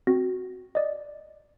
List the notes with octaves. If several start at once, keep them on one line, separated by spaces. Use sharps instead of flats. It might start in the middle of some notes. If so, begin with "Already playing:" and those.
C4 F#4 A#6
D5 D#5